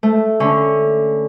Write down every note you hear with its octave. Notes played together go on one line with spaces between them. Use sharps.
A3
D3 C#4